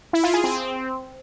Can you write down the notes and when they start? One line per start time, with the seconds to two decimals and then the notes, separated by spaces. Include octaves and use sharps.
0.13 E4
0.23 F4
0.34 G#4
0.44 C4